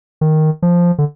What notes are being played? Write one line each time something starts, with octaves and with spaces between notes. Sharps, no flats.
D#3
F3
D3